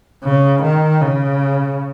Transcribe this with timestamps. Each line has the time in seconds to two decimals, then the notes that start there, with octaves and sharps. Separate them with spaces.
0.24 C#3
0.63 D#3
1.01 C#3